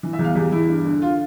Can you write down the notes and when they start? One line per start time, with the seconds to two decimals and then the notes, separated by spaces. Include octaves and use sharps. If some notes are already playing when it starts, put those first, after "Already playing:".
0.03 E3
0.13 E5
0.19 E2
0.24 F5
0.35 E2 G4
0.52 E2 E4
0.68 G2
0.85 D3
1.02 F4